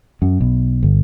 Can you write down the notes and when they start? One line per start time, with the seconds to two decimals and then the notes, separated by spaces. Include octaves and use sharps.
0.22 F#2
0.41 B1
0.83 G1